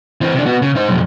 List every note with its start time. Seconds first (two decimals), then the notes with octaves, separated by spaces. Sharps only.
0.21 E3 C4
0.34 C3 D4
0.46 B3 F#4
0.62 C#3
0.76 D#4 C5
0.89 B1 F2